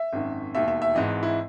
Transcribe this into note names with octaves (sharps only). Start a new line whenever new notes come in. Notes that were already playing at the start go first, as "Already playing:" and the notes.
Already playing: E5
G#1 F#2 D#3
E1 D#2 D#3 E5
E5
E5
G#1 G#2 E3 D#5
E4